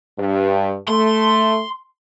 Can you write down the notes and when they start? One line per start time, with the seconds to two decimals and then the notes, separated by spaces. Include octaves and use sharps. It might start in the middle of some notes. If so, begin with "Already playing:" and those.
0.18 G2
0.88 A3 C6